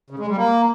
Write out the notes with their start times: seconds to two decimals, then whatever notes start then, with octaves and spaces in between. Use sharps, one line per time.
0.10 C#3
0.19 G#3
0.28 G3
0.37 A#3